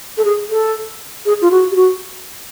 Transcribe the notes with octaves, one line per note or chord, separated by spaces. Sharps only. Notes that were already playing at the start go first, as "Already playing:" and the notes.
A4
G#4
A4
G#4
F4
F#4
G4
F#4